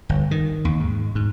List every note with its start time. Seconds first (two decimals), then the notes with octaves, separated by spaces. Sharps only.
0.09 G1
0.31 D#3
0.65 D#2
0.80 G#2
1.15 G#2